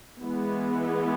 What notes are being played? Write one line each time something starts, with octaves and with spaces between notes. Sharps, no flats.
E3 G#3 B3 E4